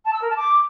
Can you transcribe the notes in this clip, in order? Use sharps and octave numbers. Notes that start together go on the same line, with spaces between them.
A5
E6
A#4
A5
D6